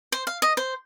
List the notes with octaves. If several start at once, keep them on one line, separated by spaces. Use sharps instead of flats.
C5
F5
D#5
C5